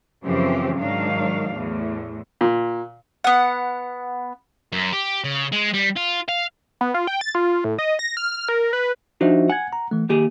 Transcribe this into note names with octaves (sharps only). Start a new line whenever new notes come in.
F#2 C#3 E3 F3 C4 G4
G#2 D#3 F#3 D4 F5
E2 A2
A#2
B3 F#5
F#2
G4
C#3
G#3
G3
F4
F5
B3
F4
G5
A6
F4
A2
D#5
A#6
F6
A#4
B4
F3 D4 D#4 F#4 C5 E5
F#5 G#5 G#6
A#5
E3 A3
D#3 A#3 G4 G#4